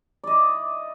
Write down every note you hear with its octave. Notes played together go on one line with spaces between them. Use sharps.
E4 D5 D#5